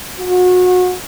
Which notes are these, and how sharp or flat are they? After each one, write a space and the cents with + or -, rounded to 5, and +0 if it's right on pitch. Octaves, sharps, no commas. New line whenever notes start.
F#4 -30